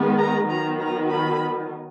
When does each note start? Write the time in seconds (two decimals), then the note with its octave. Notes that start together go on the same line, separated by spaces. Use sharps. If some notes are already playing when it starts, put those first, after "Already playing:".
Already playing: D#3 G#3 B3
0.18 A#5
0.48 D#3 F#3 B3 A#5
0.79 A#5
1.10 B5